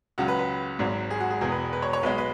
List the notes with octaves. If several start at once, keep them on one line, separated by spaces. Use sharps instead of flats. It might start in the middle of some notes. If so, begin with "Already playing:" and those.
C#2 C#3 F#3 F#4
B4
B4
G#1 G#2 F#3
G#4
F#4
G#4
E1 E2 B2 G#4
B4
B4
C#5
C#5
B1 B2 G#3 B4
B4